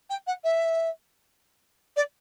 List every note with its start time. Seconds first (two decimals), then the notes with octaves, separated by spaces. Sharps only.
0.10 G5
0.27 F#5
0.44 E5
1.96 D5